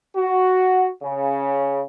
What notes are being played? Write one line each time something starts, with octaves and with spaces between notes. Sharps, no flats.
F#4
C#3